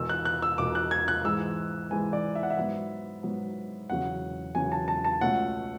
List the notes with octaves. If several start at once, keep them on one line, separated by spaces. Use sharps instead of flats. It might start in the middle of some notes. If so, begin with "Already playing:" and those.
Already playing: E1 E2 B2 E6
F#6
F#6
E6
E1 E2 B2 D6
F#6
G#6
F#6
G#2 E3 G#3 E6
G#2 E3 G#3 G#5
D5
E5
F#5
E5
G#2 F#3 B3
G#2 F#3 B3
E1 E2 C#3 F#3 F#5
E1 E2 C#3 F#3 G#5
A5
A5
A5
C#2 B2 A3 C#4 F#5